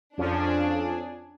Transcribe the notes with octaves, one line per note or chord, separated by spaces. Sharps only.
F2 F3 C#4 D4 G#4